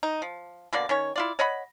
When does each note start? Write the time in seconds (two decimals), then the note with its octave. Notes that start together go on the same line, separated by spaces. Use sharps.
0.03 D#4
0.22 F3
0.73 B2 D3 A#3 D5
0.89 D#3 C#4 C#5
1.16 E4 F4 D5
1.39 C#5 D#5 F#5 B5